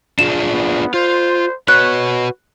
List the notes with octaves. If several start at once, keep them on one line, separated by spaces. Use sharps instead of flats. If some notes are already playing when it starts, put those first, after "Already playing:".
D4 F4 G#4 E7
B3
F4 C5
F#4 B4 C#5 F#6